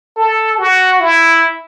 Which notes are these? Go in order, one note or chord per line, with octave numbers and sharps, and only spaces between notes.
A4
F#4
E4